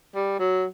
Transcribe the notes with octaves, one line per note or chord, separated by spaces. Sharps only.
G3
F#3